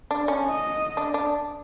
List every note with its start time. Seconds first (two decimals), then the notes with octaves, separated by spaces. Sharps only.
0.11 D4
0.28 C#4
0.45 D#5
0.97 D4
1.14 D4